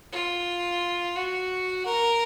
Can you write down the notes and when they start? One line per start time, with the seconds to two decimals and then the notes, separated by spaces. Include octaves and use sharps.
0.12 F4
1.16 F#4
1.86 A#4